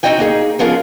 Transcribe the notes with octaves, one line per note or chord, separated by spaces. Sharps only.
C4 D#4 F#4 D#5 G5 G#5
A#3 D#4 G#4
F3 B3 C#4 F4 G#4 A#4